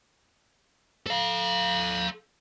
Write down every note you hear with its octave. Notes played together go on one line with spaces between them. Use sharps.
A4 F5